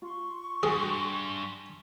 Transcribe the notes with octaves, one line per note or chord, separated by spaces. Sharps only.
F4 C6 C#6
G2 F#4 G#4 G5 G#5